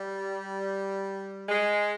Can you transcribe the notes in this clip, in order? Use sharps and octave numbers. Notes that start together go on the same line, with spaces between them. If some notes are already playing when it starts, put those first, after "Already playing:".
Already playing: G3
G#3